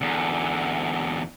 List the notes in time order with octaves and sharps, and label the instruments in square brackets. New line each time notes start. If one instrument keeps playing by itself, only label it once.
[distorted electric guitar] E2 D3